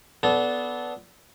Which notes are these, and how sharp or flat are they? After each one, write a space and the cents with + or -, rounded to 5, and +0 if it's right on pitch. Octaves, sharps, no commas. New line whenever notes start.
B3 +0 D4 -20 A4 -20